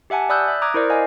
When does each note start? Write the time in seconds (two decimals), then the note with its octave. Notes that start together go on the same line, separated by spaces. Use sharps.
0.10 G4 E5 F#5 G#5 A5
0.29 D5 B5 D#6 E6 F#6 G6
0.48 E5
0.62 A#5 D6 D#6 F#6 G#6
0.74 E4 A#4 C5 D5
0.90 D#5 F5 G#5